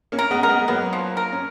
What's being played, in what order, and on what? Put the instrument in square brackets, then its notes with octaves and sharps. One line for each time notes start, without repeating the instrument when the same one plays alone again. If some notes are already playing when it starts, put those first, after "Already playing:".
[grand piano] A#3 C#4
[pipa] A#4
[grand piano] G#3 B3
[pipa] A#4
[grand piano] G#3 B3
[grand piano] F#3 A#3 [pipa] B3
[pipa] F3
A#4
[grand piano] C#4